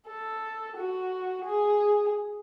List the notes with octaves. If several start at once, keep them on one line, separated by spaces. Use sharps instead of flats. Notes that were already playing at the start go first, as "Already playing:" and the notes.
A4
F#4
G#4